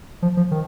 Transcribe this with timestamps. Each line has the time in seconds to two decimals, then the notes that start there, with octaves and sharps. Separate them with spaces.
0.22 F3
0.37 F3
0.51 D#3